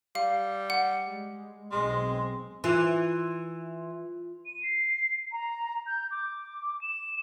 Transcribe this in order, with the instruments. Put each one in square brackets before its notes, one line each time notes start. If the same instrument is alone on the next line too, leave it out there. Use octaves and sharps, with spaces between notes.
[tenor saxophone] G3 [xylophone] F5
[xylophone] F#5
[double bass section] G#3
[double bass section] B1 C4 [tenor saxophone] G#3 [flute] C6
[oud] E3 [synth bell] F4 C6
[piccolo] D#7
C7
A#5
G6
D6
E7